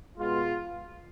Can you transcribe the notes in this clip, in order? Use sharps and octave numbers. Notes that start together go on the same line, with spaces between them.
B2 G#3 B3 F4